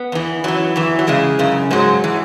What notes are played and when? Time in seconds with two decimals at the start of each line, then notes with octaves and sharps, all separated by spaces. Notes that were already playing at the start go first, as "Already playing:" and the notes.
Already playing: B3
0.12 E2 E3
0.44 F#2 E3 F#3
0.76 E2 E3
0.99 F#3
1.07 E2 C#3 G#3
1.39 F#2 C#3
1.71 G#2 F#3 G#3
2.04 E3